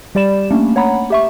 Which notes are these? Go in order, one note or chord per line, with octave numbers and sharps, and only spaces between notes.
G3 G4 D5 B5 E7
A3 A#3 C#4 D4
C#5 F#5 A#5 B5
G4 E5 C#6